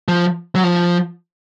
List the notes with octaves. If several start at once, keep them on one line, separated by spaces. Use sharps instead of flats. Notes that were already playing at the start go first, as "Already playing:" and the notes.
F3
F#3
F3